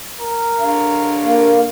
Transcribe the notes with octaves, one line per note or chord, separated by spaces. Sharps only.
A#4
D3 F5
A#3